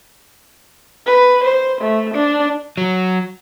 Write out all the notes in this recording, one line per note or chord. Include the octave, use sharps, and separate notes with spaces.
B4
C5
A3
D4
F#3